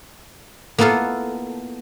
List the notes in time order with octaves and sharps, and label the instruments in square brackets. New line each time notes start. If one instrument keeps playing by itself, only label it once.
[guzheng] A#3 B3 E4 F4 A4